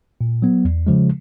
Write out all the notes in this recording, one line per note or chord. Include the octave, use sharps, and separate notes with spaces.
A#2
F#3 B3
E2
C#3 F3 G#3